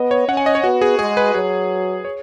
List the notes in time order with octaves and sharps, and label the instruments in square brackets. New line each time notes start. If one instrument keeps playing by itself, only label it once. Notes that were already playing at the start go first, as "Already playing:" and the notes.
Already playing: [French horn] B3 [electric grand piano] D#5
[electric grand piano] C#5
[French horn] C#4 [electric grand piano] F#5
[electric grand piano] G#5
D#5
C#5
[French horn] B3 [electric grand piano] F#4
[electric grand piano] G#4
[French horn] G#3 [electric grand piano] G#4
[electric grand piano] B4
[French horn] F#3 [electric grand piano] G#4
[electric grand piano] C#5